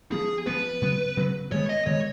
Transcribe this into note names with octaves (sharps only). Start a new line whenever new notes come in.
F3 B3 G#4
F3 B3 B4
C#3 F#3 B3
C#3 F#3 B3
D#3 G#3 B3 C#5
D#5
D#3 G#3 B3 C#5